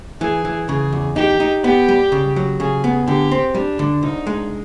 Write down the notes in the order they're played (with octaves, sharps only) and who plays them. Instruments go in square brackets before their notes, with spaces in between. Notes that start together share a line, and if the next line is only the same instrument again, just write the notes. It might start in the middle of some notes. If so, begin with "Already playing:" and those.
[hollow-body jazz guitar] E3 [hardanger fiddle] G#4
[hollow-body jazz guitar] E3
[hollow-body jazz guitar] C#3 [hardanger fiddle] G#4
[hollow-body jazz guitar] E2
[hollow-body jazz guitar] D#4 [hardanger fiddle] G4
[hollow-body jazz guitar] D#4
[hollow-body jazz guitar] B3 [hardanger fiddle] G4
[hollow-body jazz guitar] G3
C#3
F#3
[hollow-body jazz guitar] C#3 [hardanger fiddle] G#4
[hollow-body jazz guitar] B3
[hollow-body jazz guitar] D3 [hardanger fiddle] G4
[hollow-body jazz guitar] C4
[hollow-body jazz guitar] G3 [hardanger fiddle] D4
[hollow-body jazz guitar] D3
[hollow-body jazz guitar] C2 [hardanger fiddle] D#4
[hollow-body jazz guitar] G#3